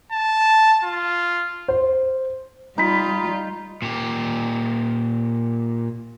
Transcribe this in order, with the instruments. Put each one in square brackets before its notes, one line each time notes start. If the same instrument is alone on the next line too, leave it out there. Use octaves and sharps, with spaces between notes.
[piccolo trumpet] A5
F4
[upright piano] C5
[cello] G3 F4 [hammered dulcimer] D#4 B5
[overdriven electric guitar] A#2 G4